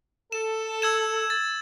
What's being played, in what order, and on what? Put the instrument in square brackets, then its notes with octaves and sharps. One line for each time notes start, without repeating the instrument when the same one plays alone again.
[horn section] A4 [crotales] E7
[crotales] E6 G#6 E7
A6